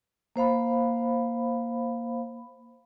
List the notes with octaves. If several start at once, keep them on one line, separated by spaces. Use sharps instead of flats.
A#3 C5 F5 B5